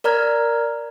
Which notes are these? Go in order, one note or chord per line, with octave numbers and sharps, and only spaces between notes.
A#4 D5 A#5 F6 G#6